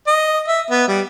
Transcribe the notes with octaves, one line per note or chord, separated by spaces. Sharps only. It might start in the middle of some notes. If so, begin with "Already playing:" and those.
D#5
E5
B3
G3